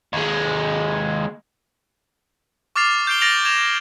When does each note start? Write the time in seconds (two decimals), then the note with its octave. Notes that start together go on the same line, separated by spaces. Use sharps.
0.13 D#2 G#3
2.76 C#6 D6 F6 A6 C7 F7
3.07 G6 C7 D7 G7
3.21 F6 A6 A#6 D7 F7 F#7
3.45 G#6 E7 F7